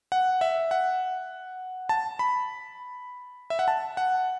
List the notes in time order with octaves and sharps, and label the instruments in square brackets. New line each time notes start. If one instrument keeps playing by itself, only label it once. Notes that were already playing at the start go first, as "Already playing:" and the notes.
[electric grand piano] F#5
E5
F#5
A5
B5
E5
F#5
A5
F#5